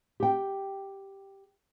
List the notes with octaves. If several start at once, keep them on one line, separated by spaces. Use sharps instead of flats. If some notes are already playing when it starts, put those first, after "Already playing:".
G4 G5